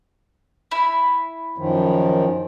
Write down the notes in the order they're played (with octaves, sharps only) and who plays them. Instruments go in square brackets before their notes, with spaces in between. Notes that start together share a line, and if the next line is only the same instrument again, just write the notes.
[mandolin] E4
[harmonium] F#2 D#3 F3